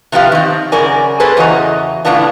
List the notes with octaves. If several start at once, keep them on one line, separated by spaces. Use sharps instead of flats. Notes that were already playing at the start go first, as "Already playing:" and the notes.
C3 F3 B3 G4 F5
D#3 C4
F#2 C#3 A#4 D5 G#5
A#3 G#4 A4 B4 C5
E2 C#3 F#4 D#5 A#5
A2 C#3 G#3 B3 D4 F4